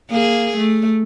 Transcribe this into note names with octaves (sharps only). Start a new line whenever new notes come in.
A#3 G#4
A3